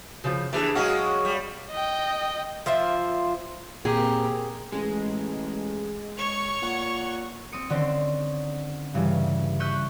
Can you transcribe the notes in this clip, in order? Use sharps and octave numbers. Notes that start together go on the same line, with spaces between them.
C#3 F3
E3 D4 G4 G#4
F#3 G#3 C#4 F#4 G#4 F5
G3
D#5 G5
F3 F4 C5 E5
A#2 A#3 C4 G4 G#4 A#5
A1 G#3
C#5 C#6
A#2 F#5
C4 D#6 C#7
D3 D#3 C4 C#4 C5
G2 C#3 E3 G3
C#6 E6 F#6 G6 B6 D#7